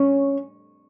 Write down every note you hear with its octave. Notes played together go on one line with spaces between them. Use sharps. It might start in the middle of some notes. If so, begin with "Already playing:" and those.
Already playing: C#4